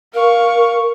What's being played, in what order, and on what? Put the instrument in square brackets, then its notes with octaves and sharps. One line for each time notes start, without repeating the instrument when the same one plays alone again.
[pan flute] A#4 [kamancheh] F5 C#6